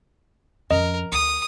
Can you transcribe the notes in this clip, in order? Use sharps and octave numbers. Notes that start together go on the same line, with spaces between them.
F2 C#4 A#4 D#5
D2 D#6